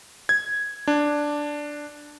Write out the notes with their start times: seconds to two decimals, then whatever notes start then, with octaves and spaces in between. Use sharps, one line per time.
0.29 G#6
0.88 D4